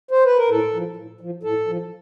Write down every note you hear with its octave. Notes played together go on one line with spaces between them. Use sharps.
C5
B4
A#4
A2 A4
F3
A2
F3
A2 A4
F3